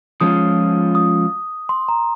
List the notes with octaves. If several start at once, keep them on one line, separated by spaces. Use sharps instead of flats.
F3 G#3 C#4 F4 D#6
D#6
C6
A#5